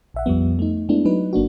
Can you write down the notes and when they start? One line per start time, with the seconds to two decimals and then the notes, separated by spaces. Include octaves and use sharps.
0.14 A#1 E5 F#5
0.26 F2 F3 G3 B3
0.59 A3 D#4
0.89 G#3 A3 B3 D4 E4
1.05 F#3 D#4 B4
1.33 G1 A#3 D4 F#4